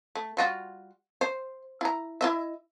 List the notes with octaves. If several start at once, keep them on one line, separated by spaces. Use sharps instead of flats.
A3
G3 F4 F#4
C5
E4 A#5
E4 D#5 E5